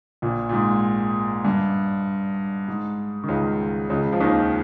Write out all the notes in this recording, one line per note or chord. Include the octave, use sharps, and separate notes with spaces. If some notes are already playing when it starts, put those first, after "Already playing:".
A#1 A#2
A#2
G#2
G2
G#2
D#3
C#2 C#3
C#2 C#3
F3
D#2 D#3